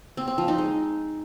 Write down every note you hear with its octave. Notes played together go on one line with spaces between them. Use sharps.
C4
C4
F3
D#4
G#3